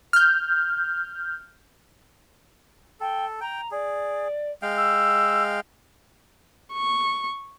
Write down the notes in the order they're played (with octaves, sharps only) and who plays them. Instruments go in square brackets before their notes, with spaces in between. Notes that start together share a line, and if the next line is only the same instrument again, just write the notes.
[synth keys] F6 G6
[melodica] A4 [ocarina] G5
[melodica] G5 [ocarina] A#5
[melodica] G#4 [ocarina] D5
[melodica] G#3 F5 G5
[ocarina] E6
[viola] C#6